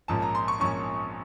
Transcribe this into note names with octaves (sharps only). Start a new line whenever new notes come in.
A#1 G#2 F3 A#3 C#4 A5
A#5
C6
C#6
A#1 G#2 F3 A#3 C#4 C#6